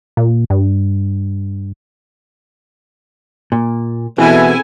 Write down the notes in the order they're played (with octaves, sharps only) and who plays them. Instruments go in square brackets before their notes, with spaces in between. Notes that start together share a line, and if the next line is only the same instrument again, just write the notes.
[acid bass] A#2
G2
[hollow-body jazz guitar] A#2
[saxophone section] B2 E3 [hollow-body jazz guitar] C4 G#4 [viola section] E4 A4 G#5